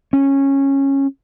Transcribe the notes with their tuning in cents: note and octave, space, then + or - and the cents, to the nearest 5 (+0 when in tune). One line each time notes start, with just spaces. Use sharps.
C#4 -15